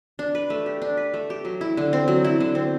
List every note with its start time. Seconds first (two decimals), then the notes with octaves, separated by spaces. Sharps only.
0.19 D4
0.35 B4
0.50 A3
0.66 G4
0.82 D4
0.97 B4
1.14 A3
1.30 G4
1.45 F#3
1.61 E4
1.77 D3
1.93 C4
2.08 F#3
2.24 E4
2.40 D3
2.55 C4